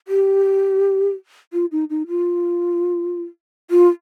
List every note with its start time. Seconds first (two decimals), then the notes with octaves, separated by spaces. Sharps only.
0.08 G4
1.53 F4
1.72 D#4
1.90 D#4
2.08 F4
3.71 F4